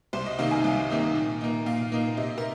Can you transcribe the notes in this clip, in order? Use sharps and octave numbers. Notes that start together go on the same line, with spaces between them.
C2 C5
D#5
C3 D#3 A#3 D#4 F5
G#5
C2
C3 D#3 A#3 D#4
A#2
A#3 D#4
A#2 F5
A#3 D#4
C3 D#5
A#4